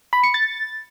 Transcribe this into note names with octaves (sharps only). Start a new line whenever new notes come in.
B5
C#7
A6